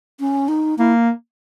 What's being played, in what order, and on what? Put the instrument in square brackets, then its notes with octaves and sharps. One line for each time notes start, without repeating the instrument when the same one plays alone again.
[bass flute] C#4
D#4
[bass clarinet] A#3 [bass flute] E4